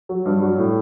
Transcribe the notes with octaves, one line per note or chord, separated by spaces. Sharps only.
F#3
G2
F#3
A2